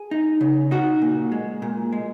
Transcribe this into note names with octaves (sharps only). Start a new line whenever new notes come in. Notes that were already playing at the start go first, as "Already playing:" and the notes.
Already playing: G#4
D#4
C#3
D#4 F#4
A#2
G#3
A#2
G#3